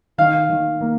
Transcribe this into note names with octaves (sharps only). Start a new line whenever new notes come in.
D#3 F5
D#3
A#3